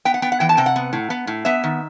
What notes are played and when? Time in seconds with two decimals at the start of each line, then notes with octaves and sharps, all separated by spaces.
0.05 B3 G5
0.14 F#5
0.22 B3 G5
0.32 F#5
0.40 E3 G5
0.49 A5
0.57 C3 G5
0.66 F#5
0.76 B3
0.93 A2
1.10 B3
1.27 A2
1.45 B3 E5
1.64 D#3